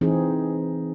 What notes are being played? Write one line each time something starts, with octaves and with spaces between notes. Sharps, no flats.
E3 C4 D#4 G#4